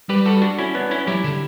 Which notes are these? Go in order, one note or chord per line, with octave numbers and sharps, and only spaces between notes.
G3 G4 B4
F#4 A4
D4 F#4
C#4 E4
B3 D4
C#4 E4
F#3 E4 G4
D3